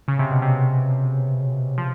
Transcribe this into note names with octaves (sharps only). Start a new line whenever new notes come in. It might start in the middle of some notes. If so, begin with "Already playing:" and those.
C#3
C3
B2
C3
F3